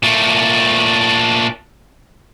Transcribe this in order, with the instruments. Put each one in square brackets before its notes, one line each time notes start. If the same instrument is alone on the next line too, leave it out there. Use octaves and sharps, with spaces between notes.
[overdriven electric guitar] A#2 A3